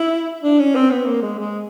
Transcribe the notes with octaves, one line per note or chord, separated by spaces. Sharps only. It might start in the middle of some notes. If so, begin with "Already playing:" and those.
Already playing: E4
D4
C#4
C4
B3
A#3
G#3
G#3